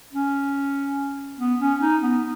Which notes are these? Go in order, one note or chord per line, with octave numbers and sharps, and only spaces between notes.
C#4
B3
C#4
D#4
B3